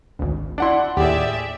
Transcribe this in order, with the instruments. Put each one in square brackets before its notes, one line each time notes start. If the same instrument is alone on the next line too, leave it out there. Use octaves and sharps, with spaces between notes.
[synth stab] G#1 D2
[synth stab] D4 E4 [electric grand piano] D5 F#5 C6
[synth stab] D#2 A2 [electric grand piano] G4 G#4 [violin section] D5 E5